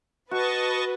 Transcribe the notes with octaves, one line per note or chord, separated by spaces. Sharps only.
F#4 B4 D#5 A5 C#6